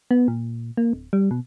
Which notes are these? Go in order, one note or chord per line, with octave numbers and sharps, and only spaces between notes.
B3
A#2
A#3
D1
G3
B2